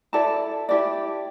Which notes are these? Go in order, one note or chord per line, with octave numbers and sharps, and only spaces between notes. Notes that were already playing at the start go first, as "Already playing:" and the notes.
E4 A4 D5 A5
E4 G4 D5